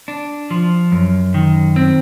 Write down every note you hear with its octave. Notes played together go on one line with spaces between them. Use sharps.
D4
F3
F#2
D#3
C4